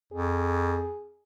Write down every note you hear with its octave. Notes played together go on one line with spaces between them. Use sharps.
F2 G#4